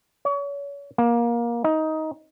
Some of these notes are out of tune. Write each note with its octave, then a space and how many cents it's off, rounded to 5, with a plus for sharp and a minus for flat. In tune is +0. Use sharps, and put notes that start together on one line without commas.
C#5 +35
A#3 +20
D#4 +15